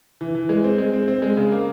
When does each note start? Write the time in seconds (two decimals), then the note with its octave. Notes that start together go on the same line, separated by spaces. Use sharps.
0.21 E3
0.35 E3
0.49 G#3
0.64 C4
0.78 G#3
0.93 C4
1.08 C4
1.22 G#3
1.37 C#3
1.52 A#3